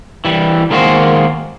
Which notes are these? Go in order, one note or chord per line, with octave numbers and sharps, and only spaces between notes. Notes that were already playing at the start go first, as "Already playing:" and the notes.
E3 G3
D#3 G#3 A#3 C#4 F#4 C5